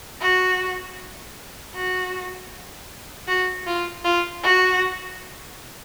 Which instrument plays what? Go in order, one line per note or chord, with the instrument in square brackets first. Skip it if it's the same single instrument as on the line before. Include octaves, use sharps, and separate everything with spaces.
[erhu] F#4
F#4
F#4
F4
F4
F#4